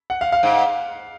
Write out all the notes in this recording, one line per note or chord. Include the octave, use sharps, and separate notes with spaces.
F#5
F5
F5
G#2